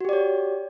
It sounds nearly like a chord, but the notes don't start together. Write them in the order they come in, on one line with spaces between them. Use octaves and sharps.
F#4 G4 D5 C#5